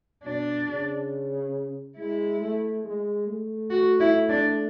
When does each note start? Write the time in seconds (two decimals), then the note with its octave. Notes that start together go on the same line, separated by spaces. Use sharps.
0.24 B2 D4
0.68 C#3
1.97 G#3 E4
2.41 A3
2.84 G#3
3.27 A3
3.70 F#4
4.00 E4
4.29 D4